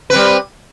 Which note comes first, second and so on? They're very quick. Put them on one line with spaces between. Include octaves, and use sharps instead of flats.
B4 C4 G3